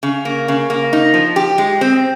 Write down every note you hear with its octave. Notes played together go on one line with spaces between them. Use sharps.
C#3
A#3
C#3
A#3
D#4
F3
G4
G#3
C4